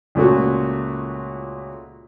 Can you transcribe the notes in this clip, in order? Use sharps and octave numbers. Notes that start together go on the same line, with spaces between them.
C#2 A#2 A3 F#4